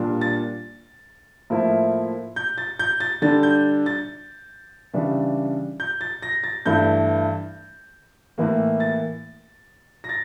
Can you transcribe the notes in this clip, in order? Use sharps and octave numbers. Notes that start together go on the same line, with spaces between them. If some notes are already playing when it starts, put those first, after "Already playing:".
Already playing: A#2 G3 D4 F4
A6
A2 F3 A#3 E4
G6
A6
G6
A6
D3 G3 D4 A6
G6
A6
C#3 E3 G3 D4
G6
A6
A#6
A6
G2 E3 A3 E4 G6
A2 E3 A#3
A6
A#6
A6